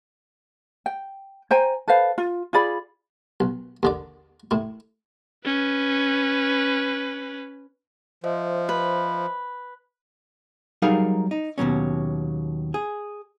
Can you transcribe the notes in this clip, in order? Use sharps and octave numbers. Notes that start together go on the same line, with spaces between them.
G5
C5 G5 G#5 A#5
A4 B4 C5 F5
F4
F4 G#4 D5 B5
B1
D#2 D3 D5
A2 E4
C#4 B4
F3 C5 D#5 E5
B4
F#3 G3 D#4 G#4 A#4 F5
D#4
D#2 B2 F#3 C#4
G#4